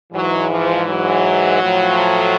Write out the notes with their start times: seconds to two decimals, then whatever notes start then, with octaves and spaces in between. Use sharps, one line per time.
0.13 G#2 E3 F#3
0.49 F3
0.87 F#3
1.61 A2 F3